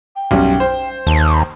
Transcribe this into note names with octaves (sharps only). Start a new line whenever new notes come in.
G5
B1 F#2 G3
C5
D#2 A5